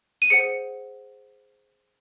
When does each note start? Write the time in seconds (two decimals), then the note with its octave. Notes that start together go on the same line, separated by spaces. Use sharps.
0.22 D#7
0.30 G#4 C5 F#5 C#7